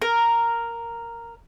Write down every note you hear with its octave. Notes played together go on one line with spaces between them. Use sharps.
A#4